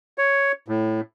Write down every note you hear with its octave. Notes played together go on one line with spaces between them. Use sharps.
C#5
A2